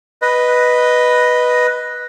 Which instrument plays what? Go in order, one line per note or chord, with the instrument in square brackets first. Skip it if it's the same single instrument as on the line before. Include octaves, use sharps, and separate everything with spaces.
[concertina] B4 D#5